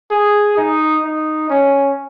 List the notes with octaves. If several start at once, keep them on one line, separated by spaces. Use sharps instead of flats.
G#4
D#4
D#4
C#4